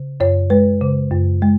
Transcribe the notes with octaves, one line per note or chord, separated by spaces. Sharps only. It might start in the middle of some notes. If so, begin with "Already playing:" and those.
Already playing: C#3
F#2 C#5
G#3 B4
C#3
F#2
G#3